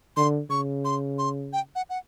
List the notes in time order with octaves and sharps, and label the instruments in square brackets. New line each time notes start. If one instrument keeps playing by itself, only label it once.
[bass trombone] D3 [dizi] C6
[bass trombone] C#3 [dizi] C#6
[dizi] C6
C6
G5
F#5
F#5